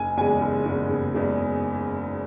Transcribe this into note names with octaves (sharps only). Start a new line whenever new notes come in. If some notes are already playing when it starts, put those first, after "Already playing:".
Already playing: F#1 G#5
E2 C#3 G#3 G#5
F#1
E2 C#3 G#3
F#1
E2 C#3 G#3